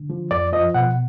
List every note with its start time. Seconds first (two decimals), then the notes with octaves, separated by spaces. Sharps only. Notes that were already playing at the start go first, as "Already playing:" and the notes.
Already playing: D3
0.10 F3
0.31 F2 D5
0.53 F3 D#5
0.74 B2 F#5